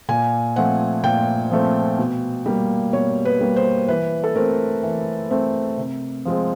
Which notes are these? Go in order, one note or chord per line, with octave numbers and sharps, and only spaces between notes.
A#2 G#5
F3 A3 C4 F#5
A#2 G5
F3 A3 C4
B2
G3 A#3
B2 C#5
B4
G3 A#3
C5
E3 B4
A4
A3 C4 A#4
E3
A3 C4
C3
F3 G#3 C4